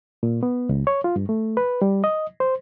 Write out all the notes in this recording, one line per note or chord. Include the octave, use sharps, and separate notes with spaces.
A#2
B3
C#2
C#5
F4
G2
A3
B4
G3
D#5
C5